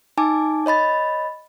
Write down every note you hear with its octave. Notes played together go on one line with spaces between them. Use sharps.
D#4 G#5 A5 D6
C#5 D#5 B5 A6